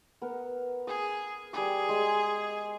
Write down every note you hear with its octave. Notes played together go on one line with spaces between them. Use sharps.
B3 A#4
G#4 D#6
G3 G#4 D6
G#3